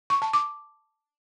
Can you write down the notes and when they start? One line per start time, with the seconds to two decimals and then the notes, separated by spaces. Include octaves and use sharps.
0.10 C#6
0.22 A5
0.33 D6